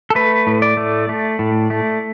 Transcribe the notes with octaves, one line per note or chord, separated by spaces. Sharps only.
A4
A3 B4
A2
D5
A3
A3
A2
A3